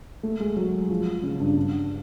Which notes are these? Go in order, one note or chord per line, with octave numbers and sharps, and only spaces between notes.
A3
G#3
F#3
F3
C#3
G2
G2